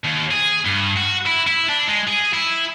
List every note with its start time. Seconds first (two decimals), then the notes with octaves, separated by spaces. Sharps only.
0.05 D#2
0.31 G#4
0.65 G2
0.96 F#4
1.26 E4
1.47 E4
1.69 D4
1.87 G#3
2.07 G#4
2.33 E4